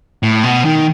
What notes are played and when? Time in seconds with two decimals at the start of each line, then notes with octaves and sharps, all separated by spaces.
0.23 A2
0.43 B2
0.65 D#3